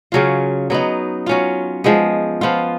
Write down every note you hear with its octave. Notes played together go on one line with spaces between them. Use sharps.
C#3 F#3 C#4 F4
F#3 B3 D#4
F#3 C#4 F4
F3 G#3 B3
F3 B3 F4